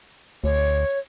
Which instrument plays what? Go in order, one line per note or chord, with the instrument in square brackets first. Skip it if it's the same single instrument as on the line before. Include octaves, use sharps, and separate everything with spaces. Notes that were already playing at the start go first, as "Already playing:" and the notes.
[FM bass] D2 [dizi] C#5